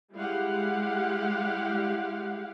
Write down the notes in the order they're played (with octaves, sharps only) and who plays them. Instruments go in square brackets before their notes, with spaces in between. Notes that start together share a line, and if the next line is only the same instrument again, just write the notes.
[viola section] G3 G#3 E4 G4 F5 F#5